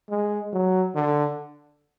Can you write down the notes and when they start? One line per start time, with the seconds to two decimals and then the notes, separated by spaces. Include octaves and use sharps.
0.10 G#3
0.53 F#3
0.95 D3